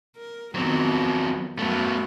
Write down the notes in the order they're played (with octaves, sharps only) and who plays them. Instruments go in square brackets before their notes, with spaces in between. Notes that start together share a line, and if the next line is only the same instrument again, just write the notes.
[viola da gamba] A#4
[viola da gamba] F2 D#3 B3 [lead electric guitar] F#3 C4
[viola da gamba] F#2 A#4 [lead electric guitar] A3 B3